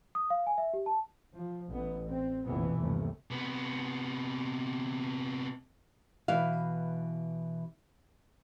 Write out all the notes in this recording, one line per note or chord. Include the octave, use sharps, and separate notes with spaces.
D#6
F5
G#5
E5
G4
A5
F3
A1 B3
C4
F1 A#1 B2 E3 B3
G1 D#2 C3 A3
C3 B3
B2 E3 E5 F5